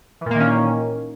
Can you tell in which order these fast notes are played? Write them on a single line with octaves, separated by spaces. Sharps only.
E3 A#2 A#3 D#3 C#4